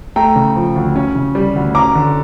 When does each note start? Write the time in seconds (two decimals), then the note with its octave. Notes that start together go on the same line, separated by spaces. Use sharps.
0.16 A3 G5 A#5
0.36 C#3
0.56 F3
0.76 D2
0.96 C#4
1.15 C#3
1.35 G3
1.55 D2
1.75 C#4 A#5 D6
1.95 D3